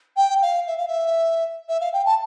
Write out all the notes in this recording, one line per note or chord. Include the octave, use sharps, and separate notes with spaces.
G5
F5
E5
F5
E5
E5
F5
G5
A5